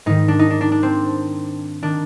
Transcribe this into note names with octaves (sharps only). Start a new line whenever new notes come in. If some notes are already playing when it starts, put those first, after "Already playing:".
G#2 D#3 D#4
D4
D#4
D4
D4
D4
C4
D#3 D4